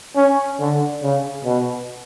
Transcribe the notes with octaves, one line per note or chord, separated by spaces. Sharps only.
C#4
D3
C#3
B2